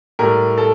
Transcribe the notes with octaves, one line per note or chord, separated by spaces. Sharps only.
A2 G3 A#4
A4